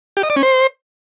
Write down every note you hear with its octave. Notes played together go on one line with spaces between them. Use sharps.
G4
D#5
D5
C#4
C5